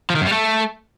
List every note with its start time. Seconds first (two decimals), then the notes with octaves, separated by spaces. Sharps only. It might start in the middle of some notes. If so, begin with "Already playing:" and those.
0.10 F3
0.15 D#3
0.21 F#2
0.27 G3
0.32 A3